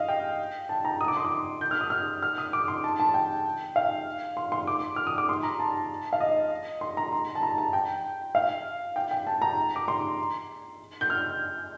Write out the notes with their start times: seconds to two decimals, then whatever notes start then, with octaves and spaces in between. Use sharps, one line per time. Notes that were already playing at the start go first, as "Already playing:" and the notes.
Already playing: D#5 F5
0.08 G5
0.69 A5
0.85 A#5
1.01 D#6
1.08 D6
1.17 C6
1.25 D6
1.61 G6
1.71 F6
1.81 D#6
1.90 F6
2.23 F6
2.38 D#6
2.53 D6
2.68 C6
2.84 A5
3.00 A5
3.14 G5
3.76 F5
4.37 C6
4.52 C6
4.67 D6
4.96 F6
5.07 D#6
5.18 D6
5.29 C6
5.43 A#5
5.59 A5
6.13 F5
6.20 D#5
6.81 C6
6.97 A#5
7.12 C6
7.35 A5
7.43 A#5
7.58 A5
7.73 G5
8.35 F5
8.96 G5
9.11 G5
9.27 A5
9.42 A#5
9.76 D6
9.88 C6
11.01 G6
11.10 F6